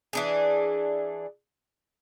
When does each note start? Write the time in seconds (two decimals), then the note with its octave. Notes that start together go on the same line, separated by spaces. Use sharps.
0.13 E3 D4 G#4